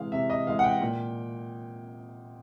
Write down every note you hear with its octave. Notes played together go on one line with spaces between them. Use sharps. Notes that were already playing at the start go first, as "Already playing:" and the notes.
Already playing: C3 E3 G#3 F5
C3 E5
D#5
E3 G#3 F5
F#5
G5
A#2